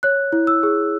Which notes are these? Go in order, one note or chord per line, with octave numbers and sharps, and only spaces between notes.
C#5 F#6
E4
E6
G#4